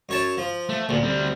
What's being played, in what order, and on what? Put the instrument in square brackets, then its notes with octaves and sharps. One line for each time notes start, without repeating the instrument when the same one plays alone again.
[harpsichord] F#2 C#5 A5
F3
[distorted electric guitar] A3
[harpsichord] D2 [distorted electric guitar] A#2
[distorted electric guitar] G3 C4